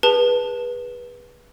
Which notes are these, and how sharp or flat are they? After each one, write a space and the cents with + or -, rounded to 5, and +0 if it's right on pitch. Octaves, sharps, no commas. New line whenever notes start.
G#4 -25 B4 -20 A5 +0